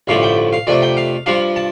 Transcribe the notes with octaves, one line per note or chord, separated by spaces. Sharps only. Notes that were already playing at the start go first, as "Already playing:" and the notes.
A1 G2 D3 F3 A3 F5
G5
F5
F2 C3 A3 D4 D5
G5
F5
G2 F3 D4 F5
A5